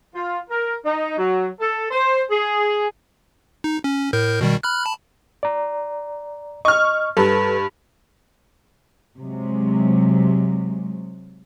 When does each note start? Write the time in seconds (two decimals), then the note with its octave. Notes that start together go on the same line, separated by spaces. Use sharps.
0.14 F4
0.50 A#4
0.85 D#4
1.18 F#3
1.60 A4
1.91 C5
2.30 G#4
3.64 D#4
3.84 C#4
4.13 A2 A#4 G6
4.41 B2 D#3 G3
4.63 B5 F6 F#6
4.84 A5 B5
5.43 D5 A#5
6.65 D#5 C#6 F6
7.17 G2 A4 B4
9.18 C3 F#3 G#3